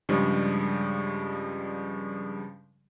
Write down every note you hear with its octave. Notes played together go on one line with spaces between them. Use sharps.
G2 C#3 F3 G3 G#3